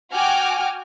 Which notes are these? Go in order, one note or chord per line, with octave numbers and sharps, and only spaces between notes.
F#4 G5 G#5 D6 F6